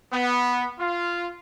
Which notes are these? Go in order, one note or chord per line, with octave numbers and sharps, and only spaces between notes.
B3
F4